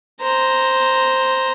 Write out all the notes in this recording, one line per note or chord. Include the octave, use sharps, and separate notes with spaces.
C5 A#5